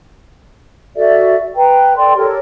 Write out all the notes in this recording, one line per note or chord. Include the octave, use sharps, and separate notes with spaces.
F#4 A4 D5 E5
B4 G5 A#5
A4 D5 G5 C6
G4 A4 A#4 C#5